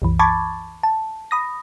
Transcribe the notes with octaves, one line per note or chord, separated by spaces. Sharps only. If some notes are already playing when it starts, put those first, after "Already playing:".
C2 F#2 E3
A5 B5 C#6 D6 G#6 A6
A5
B5 D#6 A#6